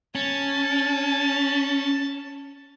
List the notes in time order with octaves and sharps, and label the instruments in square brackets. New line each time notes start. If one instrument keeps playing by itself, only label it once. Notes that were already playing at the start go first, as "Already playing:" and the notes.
[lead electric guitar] C#4 [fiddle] A5